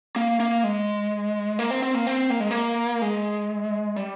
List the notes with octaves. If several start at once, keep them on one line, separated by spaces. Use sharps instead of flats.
A#3
A#3
G#3
A#3
C4
C4
A#3
C4
A#3
G#3
A#3
G#3
G3